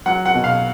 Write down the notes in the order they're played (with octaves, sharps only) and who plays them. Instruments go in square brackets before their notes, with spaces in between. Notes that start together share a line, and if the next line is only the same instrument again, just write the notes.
[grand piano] F#3 F#5
F#5
B2
F5